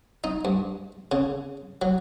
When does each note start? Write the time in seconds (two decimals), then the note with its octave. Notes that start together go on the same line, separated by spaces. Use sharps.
0.24 D#4
0.45 G2
1.12 C#3
1.82 F#3